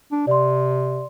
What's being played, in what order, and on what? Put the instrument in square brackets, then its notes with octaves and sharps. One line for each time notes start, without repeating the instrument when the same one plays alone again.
[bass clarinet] D4
[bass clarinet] C3 [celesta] D5 C6